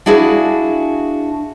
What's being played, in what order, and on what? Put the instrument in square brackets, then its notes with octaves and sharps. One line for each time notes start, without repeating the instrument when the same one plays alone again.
[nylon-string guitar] D4 E4 F#4 G#4 F5